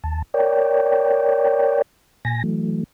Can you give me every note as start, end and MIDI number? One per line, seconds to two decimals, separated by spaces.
0.04 0.22 39
0.04 0.22 81
0.34 1.82 70
0.34 1.82 73
0.34 1.82 74
0.34 1.82 79
2.25 2.43 46
2.25 2.43 80
2.25 2.43 94
2.44 2.84 52
2.44 2.84 54
2.44 2.84 57